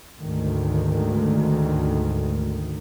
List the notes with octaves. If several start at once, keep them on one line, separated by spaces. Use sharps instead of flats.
D2 G#2 D#3